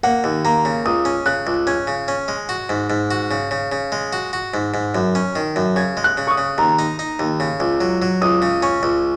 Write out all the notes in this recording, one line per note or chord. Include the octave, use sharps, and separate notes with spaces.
A#3 F#5
D#2
A#3 A#5
C#3
C#2 D#6
C#4
C#3 F#6
C#2
C#4 G#6
C#3
C#4
G#3
F#4
G#2
G#2
F#4
C#3
C#3
C#3
G#3
F#4
F#4
G#2
G#2
F#2
C#4
D#3
F#2
C#3 G#6
G#3
F#6
C#3
C#6
D#6
C#3
D#2 A#5
D#4
D#4
D#2
C#3
C#2
F#3
F#3
C#2 D#6
C#3
C#4 C#6
C#2